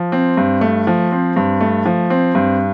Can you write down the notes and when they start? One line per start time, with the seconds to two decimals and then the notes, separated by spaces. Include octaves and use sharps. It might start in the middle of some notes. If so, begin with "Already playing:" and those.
Already playing: F3
0.12 C4
0.37 G2
0.61 A3
0.87 F3
1.12 C4
1.36 G2
1.60 A3
1.86 F3
2.10 C4
2.35 G2